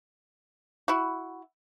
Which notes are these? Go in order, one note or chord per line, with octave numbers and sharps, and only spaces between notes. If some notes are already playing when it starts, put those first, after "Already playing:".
E4 F#4